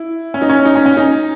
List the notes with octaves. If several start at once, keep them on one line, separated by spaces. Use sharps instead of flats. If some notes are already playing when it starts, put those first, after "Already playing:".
Already playing: E4
C#4
D#4
C#4
D#4
C#4
C#4
D#4